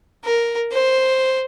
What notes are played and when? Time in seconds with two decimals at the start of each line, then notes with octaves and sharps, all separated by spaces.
0.24 A#4
0.72 C5